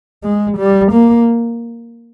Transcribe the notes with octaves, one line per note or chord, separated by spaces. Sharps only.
G#3
G3
A#3